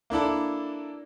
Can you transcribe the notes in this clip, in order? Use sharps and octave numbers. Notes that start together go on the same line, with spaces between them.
A#3 D4 E4 A4